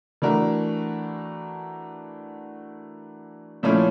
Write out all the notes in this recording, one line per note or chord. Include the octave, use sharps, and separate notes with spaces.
E3 A3 D4 F#4 A#4
A#2 F3 A3 C#4 E4